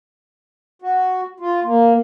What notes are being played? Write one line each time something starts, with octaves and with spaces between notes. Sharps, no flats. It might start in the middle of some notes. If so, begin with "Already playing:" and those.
F#4
F4
A#3